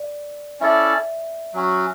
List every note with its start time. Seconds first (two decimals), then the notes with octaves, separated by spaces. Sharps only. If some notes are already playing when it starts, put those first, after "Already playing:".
Already playing: D5
0.60 C#4 E4 A4 D5 E5
1.54 F#3 C#4 F#4